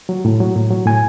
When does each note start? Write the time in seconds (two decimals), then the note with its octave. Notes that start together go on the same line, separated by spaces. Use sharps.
0.09 F#3
0.25 A2
0.40 F#3
0.56 A2
0.71 F#3
0.86 A2 G#5